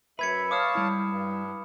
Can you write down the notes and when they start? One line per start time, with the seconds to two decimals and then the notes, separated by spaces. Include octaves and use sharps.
0.19 F#2 B4 E5 B5 G#6 C#7
0.51 C#5 F5 A5 D6 D#6 F6
0.75 G3 E4
1.11 G2